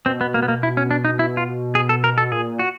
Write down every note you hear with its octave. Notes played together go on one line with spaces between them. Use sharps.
B2 C4
B3
A#3
B3
A#3
E4
C#4
D4
D#4
E4
F4
G#4
A4
A#4
A4
A#2 G#4
F#4